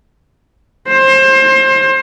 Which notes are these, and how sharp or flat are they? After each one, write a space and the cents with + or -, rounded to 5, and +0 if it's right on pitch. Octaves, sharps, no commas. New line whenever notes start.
C5 +30